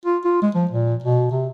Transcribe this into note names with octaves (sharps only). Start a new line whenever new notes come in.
F4
F4
G#3
F3
A#2
B2
C3